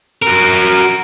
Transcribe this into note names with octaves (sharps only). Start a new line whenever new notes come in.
F#4 A#4